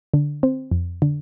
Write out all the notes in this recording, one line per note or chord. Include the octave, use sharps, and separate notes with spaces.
D3
C4
F2
D3